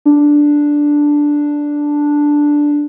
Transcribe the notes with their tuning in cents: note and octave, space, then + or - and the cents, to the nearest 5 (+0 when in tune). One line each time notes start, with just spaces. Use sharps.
D4 +0